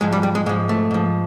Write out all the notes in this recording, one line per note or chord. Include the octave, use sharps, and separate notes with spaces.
G#2 F3 G#3
G3
G3
G#3
G#2 F3 G#3
A3
G#2 F3